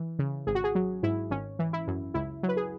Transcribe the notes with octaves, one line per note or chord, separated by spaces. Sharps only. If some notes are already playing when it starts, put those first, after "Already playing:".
Already playing: E3
C#3
G#1 G#4
F#4
G#4
F#3
G#2 E4
G#1 C#4
E3
E4
F#2
C#2 E4
F#3
B4
G#4